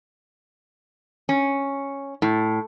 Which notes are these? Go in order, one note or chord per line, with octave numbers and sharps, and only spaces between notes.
C#4
A2